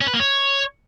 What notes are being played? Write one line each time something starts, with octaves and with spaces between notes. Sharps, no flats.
C#4
B4
A#3
C#5